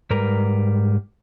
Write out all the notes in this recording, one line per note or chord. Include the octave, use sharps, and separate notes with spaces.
G#2 G3 A#4 B4 D5 A#5